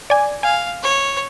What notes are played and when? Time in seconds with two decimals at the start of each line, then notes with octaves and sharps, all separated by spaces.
0.10 D5 G#5
0.43 F5 G#5
0.83 C#5